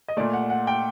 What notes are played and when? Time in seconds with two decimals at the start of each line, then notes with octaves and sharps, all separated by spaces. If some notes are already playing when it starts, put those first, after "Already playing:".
0.08 D#5
0.17 A#2 A3 D5
0.33 F#5
0.50 F#5
0.67 G5